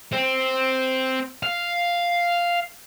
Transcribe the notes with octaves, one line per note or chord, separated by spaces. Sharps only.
C4
F5